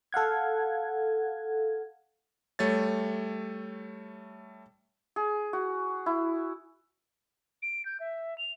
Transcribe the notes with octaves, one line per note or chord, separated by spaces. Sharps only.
A4 F5 F#5 G#6
G3 A3 C#5 A6
G#4
F#4
E4
D7
G6
E5
F7